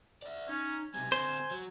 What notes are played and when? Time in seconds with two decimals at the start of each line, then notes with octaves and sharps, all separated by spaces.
0.22 D5 E5
0.49 C#4 D#4
0.94 B1 C3 G#5
1.12 D3 C4 C5 G#5
1.51 F#3